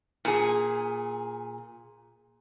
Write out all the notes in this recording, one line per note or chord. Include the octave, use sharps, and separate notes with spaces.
A#2 G#4